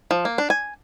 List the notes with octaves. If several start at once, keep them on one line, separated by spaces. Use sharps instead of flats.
F3
A#3
D4
G#5